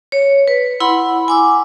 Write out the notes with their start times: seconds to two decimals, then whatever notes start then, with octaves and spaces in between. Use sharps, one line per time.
0.12 C#5
0.48 B4
0.80 E4 F#5 B5 C6
1.28 G#5 D6 E6